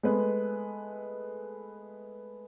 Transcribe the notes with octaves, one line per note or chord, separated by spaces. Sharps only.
G#3 A3 B3 B4